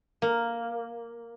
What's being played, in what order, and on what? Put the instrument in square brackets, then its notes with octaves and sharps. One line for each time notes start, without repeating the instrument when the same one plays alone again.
[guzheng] A#3